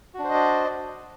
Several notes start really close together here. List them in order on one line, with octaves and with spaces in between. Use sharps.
F#4 D4 C5 D#5 D5